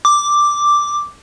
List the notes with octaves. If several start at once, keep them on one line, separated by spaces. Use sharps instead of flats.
D6